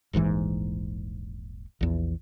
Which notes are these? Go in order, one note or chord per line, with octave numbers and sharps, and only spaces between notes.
D#1 A#1 G#2 E3
A#1 E2